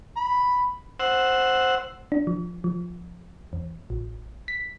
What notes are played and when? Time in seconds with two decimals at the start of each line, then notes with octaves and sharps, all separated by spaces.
0.17 B5
1.00 C5 F#5 E6
2.12 D4
2.27 F3
2.64 F3
3.53 E2
3.90 A1
4.48 B6